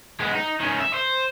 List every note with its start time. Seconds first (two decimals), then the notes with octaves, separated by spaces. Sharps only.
0.20 G#3 B3
0.35 D#4
0.60 D#3 C#4
0.80 E5
0.94 C5